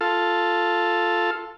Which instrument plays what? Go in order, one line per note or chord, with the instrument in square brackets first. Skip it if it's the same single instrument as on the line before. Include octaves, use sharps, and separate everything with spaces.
[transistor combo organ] F4 A4